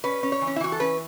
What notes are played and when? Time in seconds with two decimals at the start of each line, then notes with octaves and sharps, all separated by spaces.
0.04 C#4 B4
0.23 C#4
0.32 C#5
0.41 E3
0.47 C#4
0.56 E4
0.60 E3 F#4
0.72 A4
0.79 C#4 B4